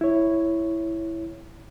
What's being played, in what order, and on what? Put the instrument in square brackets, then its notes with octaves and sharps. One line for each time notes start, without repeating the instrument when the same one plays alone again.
[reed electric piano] E4 C#5